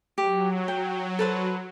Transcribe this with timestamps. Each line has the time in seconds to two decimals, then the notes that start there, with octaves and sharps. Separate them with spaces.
0.18 F#3 G4
0.68 G5
1.19 A4 B4 C5